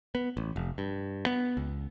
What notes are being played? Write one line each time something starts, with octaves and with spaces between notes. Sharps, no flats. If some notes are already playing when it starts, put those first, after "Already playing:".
B3
A1
F1
G2
B3
C#2